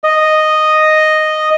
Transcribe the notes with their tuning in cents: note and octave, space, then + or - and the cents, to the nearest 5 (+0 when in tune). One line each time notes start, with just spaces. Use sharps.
D#5 -5